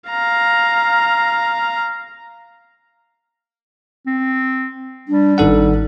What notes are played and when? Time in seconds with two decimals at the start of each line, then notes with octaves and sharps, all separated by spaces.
0.10 F5 A#5
4.06 C4
5.08 G3 D4
5.38 G#1 D#4 A4 F#5